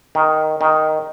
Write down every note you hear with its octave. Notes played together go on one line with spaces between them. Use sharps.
D#3
D#3